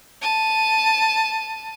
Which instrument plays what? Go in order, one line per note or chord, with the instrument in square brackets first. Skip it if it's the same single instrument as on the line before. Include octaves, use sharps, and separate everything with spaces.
[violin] A5 D#7